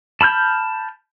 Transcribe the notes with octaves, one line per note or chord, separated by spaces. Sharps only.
A5 B5 F6 G6